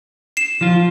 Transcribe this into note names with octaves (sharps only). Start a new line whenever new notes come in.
C7 E7
F3 F4